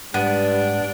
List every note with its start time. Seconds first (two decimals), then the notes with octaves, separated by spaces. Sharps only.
0.14 G#2 G3 B3 D4